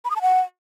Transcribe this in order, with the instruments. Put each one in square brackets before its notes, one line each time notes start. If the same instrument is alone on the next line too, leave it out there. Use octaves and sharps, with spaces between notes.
[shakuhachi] B5
D#6
A5
F#5